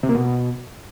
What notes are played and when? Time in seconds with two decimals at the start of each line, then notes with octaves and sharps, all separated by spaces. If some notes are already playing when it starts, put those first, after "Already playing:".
0.03 C3
0.09 A#3
0.15 B2